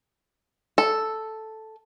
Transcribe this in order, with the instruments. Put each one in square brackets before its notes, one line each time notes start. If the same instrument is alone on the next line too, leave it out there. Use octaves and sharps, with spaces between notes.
[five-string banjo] A4